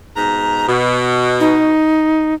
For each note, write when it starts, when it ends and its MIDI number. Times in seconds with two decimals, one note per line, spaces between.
0.16 0.66 44
0.16 0.66 47
0.16 0.66 82
0.67 1.73 47
1.40 2.34 63